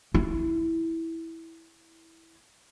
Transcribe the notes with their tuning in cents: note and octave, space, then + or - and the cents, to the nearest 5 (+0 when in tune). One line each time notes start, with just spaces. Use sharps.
E4 -5